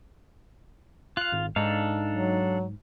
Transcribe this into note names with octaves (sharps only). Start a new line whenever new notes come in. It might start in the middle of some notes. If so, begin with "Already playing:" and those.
F4 F5 F#6
G#1
G#2 D4 D#4 A4 F5
F#3